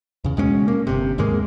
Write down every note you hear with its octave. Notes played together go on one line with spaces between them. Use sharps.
E2 C#3
B2 G#3 B3 C#4
A#3
G1 C3
D#2 G#2 G#3 A#3